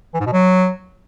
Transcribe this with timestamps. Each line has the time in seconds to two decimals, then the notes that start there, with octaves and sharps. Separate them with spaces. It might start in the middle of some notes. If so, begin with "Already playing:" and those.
0.14 E3
0.20 G#2
0.26 B2
0.32 F#3